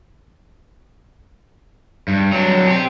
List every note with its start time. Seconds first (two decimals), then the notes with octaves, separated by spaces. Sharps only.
2.08 G2
2.32 F#3 D4
2.67 C4 G4